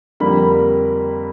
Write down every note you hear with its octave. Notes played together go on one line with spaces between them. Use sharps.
F2 D3 G3 A#3 B5